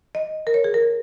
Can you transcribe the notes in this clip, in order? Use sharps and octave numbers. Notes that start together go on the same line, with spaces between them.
D#5
A#4
C#5
G#4
A#4